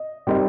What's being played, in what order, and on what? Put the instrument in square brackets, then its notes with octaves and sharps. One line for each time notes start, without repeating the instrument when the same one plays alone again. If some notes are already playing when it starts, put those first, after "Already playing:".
Already playing: [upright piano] D#5
G3 C4 D#4 A#4 D#5